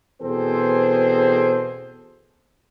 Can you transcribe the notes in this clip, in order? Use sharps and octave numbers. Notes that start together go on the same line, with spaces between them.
E2 B2 C4 G#4 A4 C5